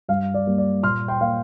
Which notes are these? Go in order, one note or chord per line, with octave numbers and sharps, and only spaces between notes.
G2 F5
D5
G3 A#3
D5
A#2 C6 F6
G5 C6
A#3 F5